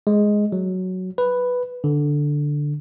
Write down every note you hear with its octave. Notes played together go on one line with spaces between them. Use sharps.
G#3
F#3
B4
D3